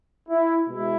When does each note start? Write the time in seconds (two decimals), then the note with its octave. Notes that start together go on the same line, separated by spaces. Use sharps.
0.29 E4
0.67 B2 G#3 E4